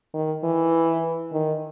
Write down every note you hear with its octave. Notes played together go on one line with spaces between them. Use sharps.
D#3
E3
D#3